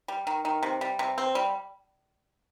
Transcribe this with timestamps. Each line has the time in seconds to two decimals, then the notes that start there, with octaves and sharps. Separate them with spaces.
0.08 G3
0.27 D#3
0.45 D#3
0.63 C3
0.81 G3
0.99 C3
1.18 C4
1.35 G3